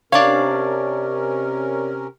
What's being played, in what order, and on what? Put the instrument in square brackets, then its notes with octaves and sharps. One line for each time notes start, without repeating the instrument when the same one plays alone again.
[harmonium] C3 C#4 A#4 [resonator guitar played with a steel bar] D4 F5 [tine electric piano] C#5 D5